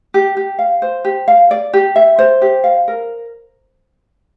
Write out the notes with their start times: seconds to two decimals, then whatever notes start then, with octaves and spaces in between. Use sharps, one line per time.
0.14 G4
0.37 G4
0.59 F5
0.82 C5
1.05 G4
1.28 F5
1.51 D5
1.73 G4
1.96 E5
2.19 C5
2.42 G4
2.64 F5
2.88 A#4